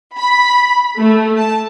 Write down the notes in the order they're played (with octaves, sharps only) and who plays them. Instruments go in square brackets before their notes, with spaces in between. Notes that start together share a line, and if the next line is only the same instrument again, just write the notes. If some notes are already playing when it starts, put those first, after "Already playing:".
[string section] B5
A3
A5